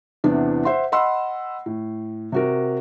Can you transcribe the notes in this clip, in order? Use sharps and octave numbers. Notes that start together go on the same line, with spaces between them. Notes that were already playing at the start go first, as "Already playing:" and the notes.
E2 C3 E3 B3 D4
C5 E5 F#5 C6
D#5 F#5 B5 C6 E6
A2
C3 F#4 A#4